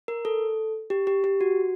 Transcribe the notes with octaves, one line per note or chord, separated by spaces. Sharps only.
A#4
A4
G4
G4
G4
F#4